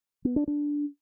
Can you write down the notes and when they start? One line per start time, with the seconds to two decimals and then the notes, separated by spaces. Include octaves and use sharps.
0.25 B3
0.36 D4
0.48 D4